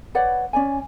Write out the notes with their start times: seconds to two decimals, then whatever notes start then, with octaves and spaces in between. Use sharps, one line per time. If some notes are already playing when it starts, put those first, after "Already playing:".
0.15 B4 C#5 D5 F#5
0.53 C#4 D5 G#5